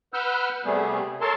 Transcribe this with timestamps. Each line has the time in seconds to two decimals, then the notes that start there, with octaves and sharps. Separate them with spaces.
0.14 B4 F#5 E6 F6 G6
0.65 C3 G3 A3 B3 G#4
1.21 A4 A#4 C#5 A5 C6